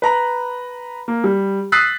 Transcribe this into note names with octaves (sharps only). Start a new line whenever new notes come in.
B4 A#5 B5
A#3
G3
D#6 E6 F#6 A6 B6 C7